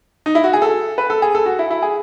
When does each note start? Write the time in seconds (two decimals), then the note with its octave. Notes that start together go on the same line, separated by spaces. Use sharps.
0.26 D#4
0.35 E4
0.44 F#4
0.53 G#4
0.62 A4
0.98 B4
1.10 A4
1.22 G#4
1.35 A4
1.46 F#4
1.59 E4
1.70 E4
1.82 G#4